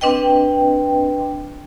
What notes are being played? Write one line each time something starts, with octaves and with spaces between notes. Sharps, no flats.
C4 D4 B4 D#5 G5